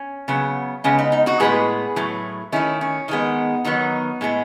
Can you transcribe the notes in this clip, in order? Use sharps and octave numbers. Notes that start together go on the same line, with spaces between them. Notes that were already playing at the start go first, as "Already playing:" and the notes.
Already playing: C#4
C#3 F#3 B3
C#3 G#3 B3 C#4
D#4
D#4
D#4 F#4
A2 G#3 B3 G#4 B4
A2 F#3 A3
D#3 A3 C#4 E4
C#4
D#3 G#3 B3 D#4
D#3 F#3 B3 D#4
A2 G#3 B3